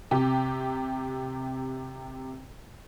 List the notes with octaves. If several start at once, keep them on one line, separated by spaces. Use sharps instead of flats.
C3 G4